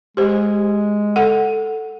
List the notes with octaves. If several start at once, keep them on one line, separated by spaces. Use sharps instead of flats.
G#3 G4 C5
A4 F#5